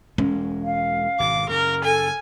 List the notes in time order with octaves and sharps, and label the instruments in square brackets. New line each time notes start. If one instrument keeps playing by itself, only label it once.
[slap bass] E1 G#3 [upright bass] C#4
[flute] F5
[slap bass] G#1 B2 [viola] D6
[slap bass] F#2 C#3 [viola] A#4
[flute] A4 [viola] G#5